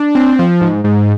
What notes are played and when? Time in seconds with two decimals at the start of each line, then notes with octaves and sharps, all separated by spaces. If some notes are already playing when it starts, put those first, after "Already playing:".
Already playing: D4
0.15 C4
0.39 F3
0.61 G#2
0.84 G#2